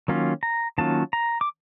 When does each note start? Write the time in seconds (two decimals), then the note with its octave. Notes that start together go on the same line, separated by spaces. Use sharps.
0.08 D#3 F#3 A#3 C#4 F4
0.43 A#5
0.78 D#3 F#3 A#3 C#4 F4 A5
1.13 A#5
1.41 D6